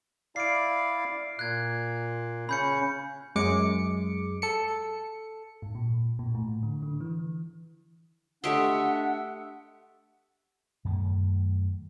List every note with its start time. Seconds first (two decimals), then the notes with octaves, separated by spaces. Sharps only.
0.36 E4 D5 F5 C7 D7
1.39 A#2 F#6 G#6
2.49 C#3 C#4 B5 G6 C#7
3.36 F#2 G#3 D6 C#7
4.42 A4 C#7
5.62 G#2
5.75 A#2
6.19 A#2
6.35 A2
6.63 D3
6.82 D3
7.00 E3
8.44 A3 D4 G4 D#5 E5 F#5 C6
10.85 F#2 D#3 A3